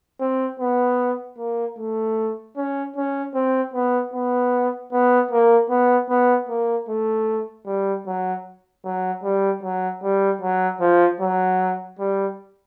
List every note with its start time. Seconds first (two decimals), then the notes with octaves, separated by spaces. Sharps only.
0.21 C4
0.60 B3
1.38 A#3
1.78 A3
2.57 C#4
2.96 C#4
3.34 C4
3.74 B3
4.14 B3
4.92 B3
5.31 A#3
5.70 B3
6.09 B3
6.49 A#3
6.89 A3
7.66 G3
8.06 F#3
8.85 F#3
9.23 G3
9.63 F#3
10.03 G3
10.41 F#3
10.81 F3
11.21 F#3
11.99 G3